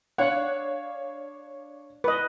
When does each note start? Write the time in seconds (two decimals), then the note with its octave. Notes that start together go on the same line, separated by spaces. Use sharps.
0.18 D4 C#5 F5 F#5
2.04 B4 D#5